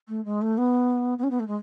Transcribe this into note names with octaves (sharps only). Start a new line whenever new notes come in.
A3
G#3
A3
B3
B3
C#4
B3
A3
G#3